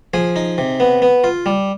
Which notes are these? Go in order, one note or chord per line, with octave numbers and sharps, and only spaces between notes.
F3 G#4
D#4
C3
B3
B3
F4
G3